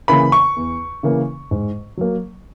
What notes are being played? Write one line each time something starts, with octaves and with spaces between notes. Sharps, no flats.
C#3 E3 A#3 B5
C#6
E2
C#3 E3 A#3
G#2
F#3 A#3